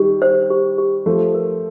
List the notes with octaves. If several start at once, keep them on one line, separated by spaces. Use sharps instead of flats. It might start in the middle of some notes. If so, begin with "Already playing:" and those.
Already playing: D#3 G3 G4
C5
G4
G4
F3 A3 G4
A#4